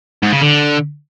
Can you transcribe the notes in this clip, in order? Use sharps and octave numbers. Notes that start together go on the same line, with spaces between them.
G#2
C#3
D3